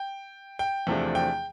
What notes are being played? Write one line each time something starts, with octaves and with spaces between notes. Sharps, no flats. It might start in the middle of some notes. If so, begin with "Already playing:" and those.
Already playing: G5
G5
E2 C3 F3 A3 D4
G5